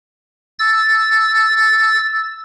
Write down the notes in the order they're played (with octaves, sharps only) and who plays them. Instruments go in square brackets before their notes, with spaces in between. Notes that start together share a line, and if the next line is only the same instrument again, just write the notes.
[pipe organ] E6 A6